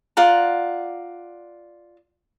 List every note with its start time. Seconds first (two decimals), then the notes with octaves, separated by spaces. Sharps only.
0.17 F4 D5 F#5 A#5